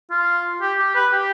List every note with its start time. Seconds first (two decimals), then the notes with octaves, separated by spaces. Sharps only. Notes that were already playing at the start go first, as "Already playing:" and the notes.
0.11 F4
0.61 G4
0.78 G4
0.95 B4
1.12 G4